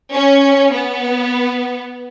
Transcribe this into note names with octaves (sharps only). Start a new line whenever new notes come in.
C#4
B3